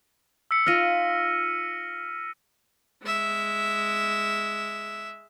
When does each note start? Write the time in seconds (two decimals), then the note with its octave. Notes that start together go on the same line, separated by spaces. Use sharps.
0.51 E6 B6 C#7
0.67 D#4 F4 F6 A#6 D#7
3.03 G#3 E5